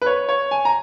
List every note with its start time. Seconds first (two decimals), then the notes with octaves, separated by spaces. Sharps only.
0.02 B4
0.06 C#5
0.29 C#5
0.51 G#5
0.65 A#5